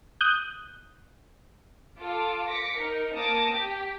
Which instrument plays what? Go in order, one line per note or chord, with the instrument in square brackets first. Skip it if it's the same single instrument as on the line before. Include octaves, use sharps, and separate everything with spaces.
[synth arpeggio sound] D#6 F#6 G6
[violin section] F4 A4 D6
D6 A#6 B6 C#7
D#4 A#4
A#3 A5 D6 D#6 A#6 C#7
G4